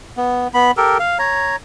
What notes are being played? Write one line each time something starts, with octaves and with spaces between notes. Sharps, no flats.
B3
B3 B5
G4 A4 A#4
F5
C#5 A#5